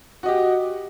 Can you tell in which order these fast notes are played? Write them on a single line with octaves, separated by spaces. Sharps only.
F#4 D#5 G4